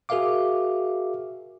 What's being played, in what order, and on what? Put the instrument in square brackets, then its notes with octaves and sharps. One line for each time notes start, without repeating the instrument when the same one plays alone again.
[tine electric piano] F#4 G#4 A#4 E5 F5 D6